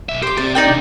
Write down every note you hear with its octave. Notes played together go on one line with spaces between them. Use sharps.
B1 E5
G4 C5 D6
C4 G4 D5
D#4 D5 G5
C3 D4